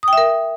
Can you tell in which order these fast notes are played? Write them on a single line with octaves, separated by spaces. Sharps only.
D#6 G5 E5 A#4